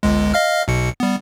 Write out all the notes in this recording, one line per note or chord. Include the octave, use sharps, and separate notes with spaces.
G1 C#2 G#3
D#5 F5 F6
B1 B2 C#7
G3 B3